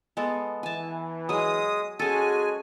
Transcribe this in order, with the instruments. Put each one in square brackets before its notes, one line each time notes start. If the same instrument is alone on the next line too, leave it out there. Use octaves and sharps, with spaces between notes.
[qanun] G#3 B3 A4
[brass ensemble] E3 [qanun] G#5 A5
[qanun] F#3 G#4 [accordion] G#3 D#6
[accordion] G#3 G#5 [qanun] C#4 A4 [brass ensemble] F#4 G#4